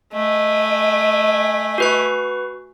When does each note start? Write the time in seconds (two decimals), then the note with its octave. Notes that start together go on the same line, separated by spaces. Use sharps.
0.13 A3 D#5 G#5
1.78 F#4 B4 C#6